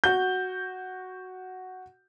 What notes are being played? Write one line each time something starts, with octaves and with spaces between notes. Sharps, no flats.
F#4 G6